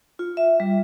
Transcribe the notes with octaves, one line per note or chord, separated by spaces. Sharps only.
F4
E5
G3